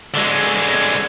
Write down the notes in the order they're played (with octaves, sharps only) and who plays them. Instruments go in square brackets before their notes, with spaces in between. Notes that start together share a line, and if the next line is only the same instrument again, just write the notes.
[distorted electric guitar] D3 G#3